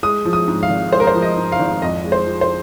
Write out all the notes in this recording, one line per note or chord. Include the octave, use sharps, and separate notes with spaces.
G#3 D#6
F3
D#6
G#2
F5
G#1
G#3 C5
A#4
C5
F3
D#5
G#2
F5
G#1
F2 D#5
G#3
C5
F3
C5